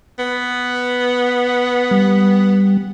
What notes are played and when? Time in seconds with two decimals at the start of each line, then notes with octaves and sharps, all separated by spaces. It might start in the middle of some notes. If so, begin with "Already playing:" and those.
0.19 B3
1.91 G3